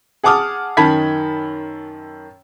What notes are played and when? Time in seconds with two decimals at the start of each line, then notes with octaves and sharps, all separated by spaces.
0.24 G#4 F#5 A5 D6 D#6 F6
0.77 F#2 D#3 A5 B5 G#6 B6